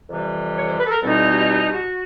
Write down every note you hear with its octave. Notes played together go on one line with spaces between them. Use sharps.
F2 C3 E3 G3
C#5
C5
B4
A4
A#4
E2 B2 G3 C4 D#4 A4
G#4
G4
G4
G4
F#4